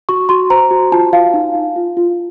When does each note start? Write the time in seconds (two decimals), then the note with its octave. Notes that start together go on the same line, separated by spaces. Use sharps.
0.09 F#4 C#6
0.29 F#4 C6
0.50 C5 A#5
0.71 F#4
0.92 F4 A5
1.12 F4 F5
1.34 D#4
1.55 D#4
1.76 F4
1.97 F4